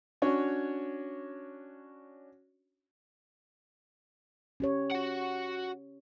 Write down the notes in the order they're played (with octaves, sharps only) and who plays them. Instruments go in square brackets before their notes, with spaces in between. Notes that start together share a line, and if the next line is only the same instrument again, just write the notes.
[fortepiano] C#4 D4 F#4 C#5
[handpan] C#4 G4 C#5
[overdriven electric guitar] F#4 F#5